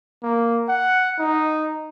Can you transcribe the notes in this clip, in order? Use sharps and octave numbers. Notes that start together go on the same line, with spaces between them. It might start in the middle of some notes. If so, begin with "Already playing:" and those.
A#3
F#5
D#4